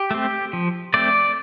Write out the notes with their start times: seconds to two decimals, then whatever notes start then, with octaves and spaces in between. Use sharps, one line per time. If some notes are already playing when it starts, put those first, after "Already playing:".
Already playing: G4
0.11 A3 C4
0.53 F3
0.94 A3 C4 D5